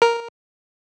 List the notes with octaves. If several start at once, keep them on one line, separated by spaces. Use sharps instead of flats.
A#4